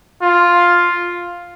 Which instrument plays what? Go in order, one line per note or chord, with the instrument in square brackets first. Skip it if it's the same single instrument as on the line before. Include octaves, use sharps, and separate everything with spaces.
[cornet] F4